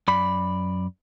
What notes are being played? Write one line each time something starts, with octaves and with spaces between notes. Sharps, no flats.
F#2 D5 B5